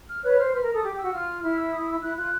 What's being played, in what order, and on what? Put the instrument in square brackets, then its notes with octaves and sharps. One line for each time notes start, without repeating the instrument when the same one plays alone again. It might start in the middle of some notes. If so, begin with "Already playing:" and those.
[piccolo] F6
[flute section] B4 C#5 [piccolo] F#6
[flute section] C5 [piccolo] F6
[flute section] B4 [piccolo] F6
[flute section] A#4
[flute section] A4 [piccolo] D#6
[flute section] G4 [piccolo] D6
[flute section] G4
[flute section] F#4 [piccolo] E6
[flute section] F4 [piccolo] F6
[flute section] E4 [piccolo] F6
[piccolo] E6
D#6
E6
[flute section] E4 [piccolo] F#6
[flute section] F4 [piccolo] F#6